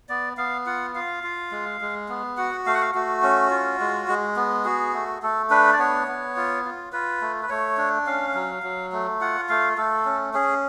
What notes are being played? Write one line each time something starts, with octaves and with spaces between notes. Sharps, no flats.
B3 D5
B3 F5
F4 F#5
F4 F5
F4
G#3
G#3
B3
F#4 F#5
A3 F5
F#5
F5
A3 F#4
C#4
F4
G#3
G#3
B3
F#4 G#4
A3
A3 A4
D4 B4
D5
B3 C#5
B3
F4
F4
F4 B4
A3
B4
A3 C#5
D4
C#4 F5
F#3
F#3
A3
F4 F#5
A3 F5
A3 A4
C#4
C#4 G#4